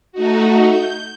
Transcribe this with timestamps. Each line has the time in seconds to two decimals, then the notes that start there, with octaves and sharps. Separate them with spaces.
0.12 A3 D#4 F#4
0.67 G6